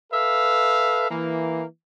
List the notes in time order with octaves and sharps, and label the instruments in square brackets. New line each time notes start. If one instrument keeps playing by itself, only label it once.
[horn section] A4 B4 E5 F5
E3 A#3